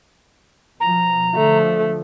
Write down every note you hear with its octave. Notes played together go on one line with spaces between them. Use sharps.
B2 F3 A#5
D3 F3 A3